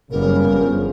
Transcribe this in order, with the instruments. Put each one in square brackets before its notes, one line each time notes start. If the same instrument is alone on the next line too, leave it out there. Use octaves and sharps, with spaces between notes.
[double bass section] F#1 G3 B3 [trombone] C#3 [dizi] A#4
[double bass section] G1 F3